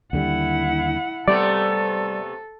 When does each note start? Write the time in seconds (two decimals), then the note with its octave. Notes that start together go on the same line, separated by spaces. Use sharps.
0.13 D#2 D3 G3 E4 F#5
1.28 C3 G3 A3 B3 A4 D5